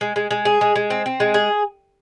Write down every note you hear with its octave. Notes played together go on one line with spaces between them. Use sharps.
G#3
G#3
G#3
G#4
G#3
G#3
C4
C4
G#3
G#4